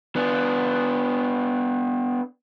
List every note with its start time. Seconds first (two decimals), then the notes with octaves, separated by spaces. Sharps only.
0.16 B3 D4